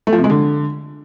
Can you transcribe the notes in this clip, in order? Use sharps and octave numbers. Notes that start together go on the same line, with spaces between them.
A3
F3
C3
G#3
D3